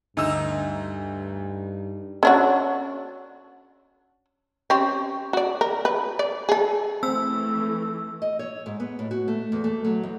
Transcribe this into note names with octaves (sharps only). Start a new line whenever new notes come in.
D2 G2 D#4 E6
C#4 D4 F#4
C4 C#4 G4
F#4 D5
A#4
B4
D5
G#4 A4
E3 A3 C4 E6
D#5
C#5
G#2
B3
A2
F#4
A3
E2
A3
F#3
E2